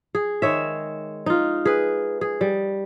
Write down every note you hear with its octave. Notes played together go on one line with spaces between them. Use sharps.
G#4
D#3 G#3 C#5 E5
D#4 F4
G#4 B4
G#4
G3